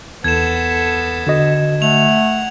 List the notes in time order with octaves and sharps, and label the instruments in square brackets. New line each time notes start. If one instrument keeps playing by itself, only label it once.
[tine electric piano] E2 [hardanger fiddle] B3 A4 [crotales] G#6 E7
[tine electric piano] D3 F#4 D#5
[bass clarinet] A3 [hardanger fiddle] F#5 [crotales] F7